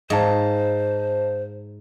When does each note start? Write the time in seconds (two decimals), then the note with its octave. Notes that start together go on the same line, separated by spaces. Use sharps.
0.10 G#2 C5 D#5 F5 A5